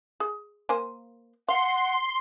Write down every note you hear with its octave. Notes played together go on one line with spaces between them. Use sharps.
G#4
A#3 C5 G#5
F5 F#5 C6